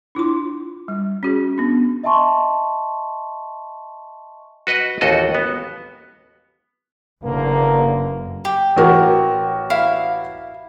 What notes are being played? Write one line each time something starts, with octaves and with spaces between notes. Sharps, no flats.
D4 E4 F4 C6
G3
C#4 F#4 G#4
B3 D4
D#5 E5 G#5 A5 C6 C#6
F#4 B4 D#5 F#5
A1 D#2 F#4 A4 D#5
B3
F#1 E2 D3 A#3
G4
A1 F#4 A#4
E4 F5